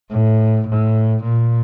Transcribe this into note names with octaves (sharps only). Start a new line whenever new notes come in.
A2
A2
A#2